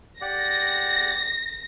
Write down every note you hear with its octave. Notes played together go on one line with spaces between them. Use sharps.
G4 D5 F#5 A#6